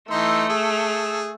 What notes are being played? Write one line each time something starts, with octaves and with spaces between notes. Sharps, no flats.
E3 A3 D#4 C6 E6
G#4